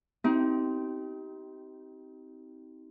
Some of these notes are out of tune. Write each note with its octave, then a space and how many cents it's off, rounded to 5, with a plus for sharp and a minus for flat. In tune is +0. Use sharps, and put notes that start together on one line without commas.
C4 -10 D#4 +30 G4 -25